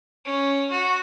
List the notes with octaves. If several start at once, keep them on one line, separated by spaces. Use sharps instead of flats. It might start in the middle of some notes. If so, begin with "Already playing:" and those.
C#4
F#4